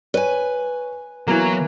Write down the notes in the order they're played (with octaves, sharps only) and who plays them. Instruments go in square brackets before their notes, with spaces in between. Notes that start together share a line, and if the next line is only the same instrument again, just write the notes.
[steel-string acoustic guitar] B4 G#5 [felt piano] C#5
[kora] E3 A#3 [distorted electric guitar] F#3 [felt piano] B3